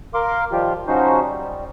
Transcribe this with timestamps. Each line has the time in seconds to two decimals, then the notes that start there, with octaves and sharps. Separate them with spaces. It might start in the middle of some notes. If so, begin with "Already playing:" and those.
0.14 A#4 F5 C6 D6
0.52 D#3 F3 G3 F4 G4
0.87 C#3 F3 C#4 D#4 F#4 C5
1.20 G3